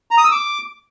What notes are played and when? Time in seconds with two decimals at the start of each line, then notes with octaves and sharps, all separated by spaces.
0.11 A#5
0.18 D#6
0.25 E6
0.32 D6